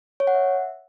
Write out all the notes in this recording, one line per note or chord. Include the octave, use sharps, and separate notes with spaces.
C#5
F#5
E5